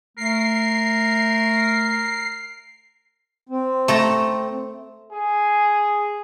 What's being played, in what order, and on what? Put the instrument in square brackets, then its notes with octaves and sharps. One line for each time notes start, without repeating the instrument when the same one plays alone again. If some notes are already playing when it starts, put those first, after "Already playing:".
[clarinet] A3 [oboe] A#4 [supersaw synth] C7
[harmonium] C4
[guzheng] A3 A4 A#5
[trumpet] G#4